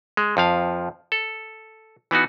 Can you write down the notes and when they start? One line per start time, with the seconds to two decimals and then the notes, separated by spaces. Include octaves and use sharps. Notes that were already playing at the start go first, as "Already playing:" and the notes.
0.17 G#3
0.37 F2 F3 F5
1.12 A4
2.11 E3 B3 D#4 F#4